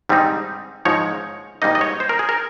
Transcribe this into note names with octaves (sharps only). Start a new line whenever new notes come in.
G#2 G3 C4 D#4
G#2 F3 G#3 D#4 C#5
G#2 G3 A#3 D#4 D#5
D#5
C#5
C5
A#4
G#4
A#4